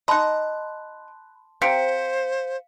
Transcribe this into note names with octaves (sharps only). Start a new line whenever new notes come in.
D#4 D#5 A5 B5 C6 F#6
C4 G4 A#4 C5 F5 B6 C#7